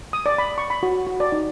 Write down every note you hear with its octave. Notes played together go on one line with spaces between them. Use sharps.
D#6
D5
B5
C#6
B5
F#4
F#4
D5
D#4